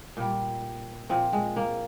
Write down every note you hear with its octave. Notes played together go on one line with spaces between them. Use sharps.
A#2 G3
A#2 F3 C4
G#3
A#3